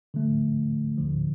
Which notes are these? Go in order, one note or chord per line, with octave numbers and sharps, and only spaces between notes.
D3 F3 A3
D2 D3 F3